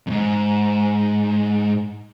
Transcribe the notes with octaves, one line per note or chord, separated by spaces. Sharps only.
F2 G#2